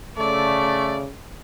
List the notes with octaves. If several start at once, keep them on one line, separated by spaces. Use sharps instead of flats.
C#3 A3 D5